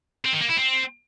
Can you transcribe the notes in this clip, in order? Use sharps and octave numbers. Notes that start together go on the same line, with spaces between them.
C4
D#3
A#3
E4
C4